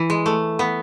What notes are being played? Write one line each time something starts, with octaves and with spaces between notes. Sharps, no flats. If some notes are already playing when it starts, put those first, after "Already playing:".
Already playing: E3
G#3
A3
B3